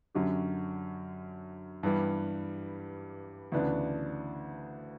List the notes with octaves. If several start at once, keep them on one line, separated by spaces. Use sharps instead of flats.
F#2 D3 F#3 C#4 G4
G2 E3 G3 B3
D2 C#3 E3 B3 D4